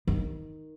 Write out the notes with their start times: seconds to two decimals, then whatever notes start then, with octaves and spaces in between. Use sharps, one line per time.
0.07 D#3